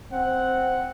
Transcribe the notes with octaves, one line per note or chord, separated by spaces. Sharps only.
C4 F#5